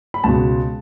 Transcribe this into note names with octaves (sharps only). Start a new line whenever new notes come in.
B5
C#2 B2 A5